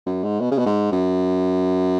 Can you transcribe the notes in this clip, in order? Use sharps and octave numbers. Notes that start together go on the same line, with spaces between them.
F#2
G#2
B2
C#3
B2
G#2
F#2